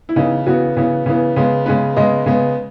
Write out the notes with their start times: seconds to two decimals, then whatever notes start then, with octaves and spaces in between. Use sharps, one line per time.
0.09 E4
0.16 C#3 E3 B3 D#4
0.46 C#3 E3 B3 F#4
0.77 C#3 E3 B3
1.06 C#3 E3 B3
1.36 C#3 G#3 B3
1.66 C#3 G#3 B3 B4
1.96 C#3 G#3 B3 D#5
2.26 C#3 G#3 B3